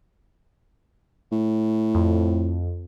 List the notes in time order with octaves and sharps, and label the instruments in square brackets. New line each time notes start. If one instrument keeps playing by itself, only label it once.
[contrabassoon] A2
[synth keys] F2